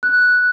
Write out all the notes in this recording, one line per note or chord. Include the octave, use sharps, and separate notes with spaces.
F#6